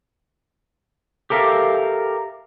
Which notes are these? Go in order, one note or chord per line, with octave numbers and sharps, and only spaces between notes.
G4 A4 A#4 E5 F5